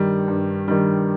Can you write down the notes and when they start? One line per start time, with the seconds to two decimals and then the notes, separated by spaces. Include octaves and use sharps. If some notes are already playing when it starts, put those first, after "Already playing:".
Already playing: G2 D#3 G3
0.28 G2
0.68 D#3 G3